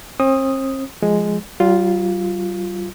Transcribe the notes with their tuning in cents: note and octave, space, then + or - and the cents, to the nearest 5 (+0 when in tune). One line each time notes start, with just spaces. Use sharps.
C4 +40 D#6 +0
F3 +0 G#3 +0
G3 -45 F4 +0